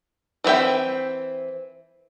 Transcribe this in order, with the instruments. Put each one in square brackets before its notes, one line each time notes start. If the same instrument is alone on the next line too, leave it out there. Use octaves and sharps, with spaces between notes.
[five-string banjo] E3 C4 D#4 E5 G5